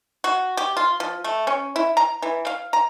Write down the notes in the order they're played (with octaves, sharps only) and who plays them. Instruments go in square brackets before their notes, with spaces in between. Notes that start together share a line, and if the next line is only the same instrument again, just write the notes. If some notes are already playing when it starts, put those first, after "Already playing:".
[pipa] F#4
G4
F4
F3
A3
C#4
E4
A#5
E3
F5
A#5